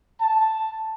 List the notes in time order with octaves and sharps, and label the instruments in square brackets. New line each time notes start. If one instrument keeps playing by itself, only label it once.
[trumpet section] A5